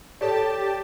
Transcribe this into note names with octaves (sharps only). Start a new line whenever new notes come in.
G4 A4 C#5 D5 A5